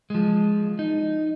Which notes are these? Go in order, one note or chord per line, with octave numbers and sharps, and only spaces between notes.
F3 G#3
D#4